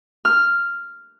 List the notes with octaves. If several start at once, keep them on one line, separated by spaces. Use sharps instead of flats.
F6